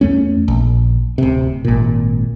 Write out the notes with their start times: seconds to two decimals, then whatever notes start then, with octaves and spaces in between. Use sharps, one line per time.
0.01 E2 A3 C#4
0.48 A#1
1.18 D1 C3
1.65 G#1 A#2